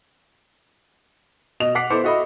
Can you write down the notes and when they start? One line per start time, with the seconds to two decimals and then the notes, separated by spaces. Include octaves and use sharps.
1.60 B2 D#5 F7
1.75 F#5 D6 B6 C7
1.90 B3 E4 A4 C5 D6 C#7
2.04 F#4 A4 D#5 E5 B5